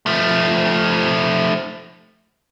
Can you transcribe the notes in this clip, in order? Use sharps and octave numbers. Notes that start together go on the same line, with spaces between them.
F3 A3